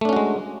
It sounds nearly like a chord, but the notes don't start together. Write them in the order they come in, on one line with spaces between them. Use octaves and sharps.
A3 D4 C#4 F#4 G#3